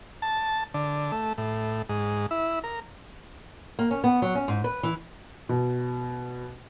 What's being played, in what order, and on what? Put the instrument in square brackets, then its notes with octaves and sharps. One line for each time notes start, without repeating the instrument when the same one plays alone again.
[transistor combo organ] A5
D3
A3
A2
G#2
E4
A#4
[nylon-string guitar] A#3
C#4
B3
F#3
C#4
G#2
B4
E3
[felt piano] B2